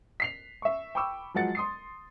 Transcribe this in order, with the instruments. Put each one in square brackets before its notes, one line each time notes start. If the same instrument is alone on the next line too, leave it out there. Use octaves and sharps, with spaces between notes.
[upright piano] B6 C7 F7
E5 C#6
G5 B5 C#6 D6 E6
F3 F#3 G#3 F#5 A6 C#7
C6 D#6 C7